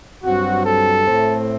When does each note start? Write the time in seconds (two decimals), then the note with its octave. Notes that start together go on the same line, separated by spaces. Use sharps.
0.23 G2 F#3 C4 F#4
0.64 A4
1.05 A2 A3 C4